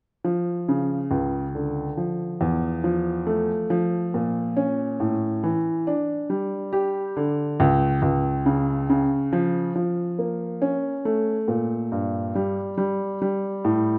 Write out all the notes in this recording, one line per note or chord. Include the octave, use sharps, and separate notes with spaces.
F3
C#3
C#2
D3
F3
E2
F3
A3
F3
A#2
C#4
A2
E3
D4
G3
G4
D3
C#2
C#2
C#3
C#3
F3
F3
A#3
C#4
A3
A#2
G2
G3
G3
G3
A2